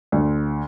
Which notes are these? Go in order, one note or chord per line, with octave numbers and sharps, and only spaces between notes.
D2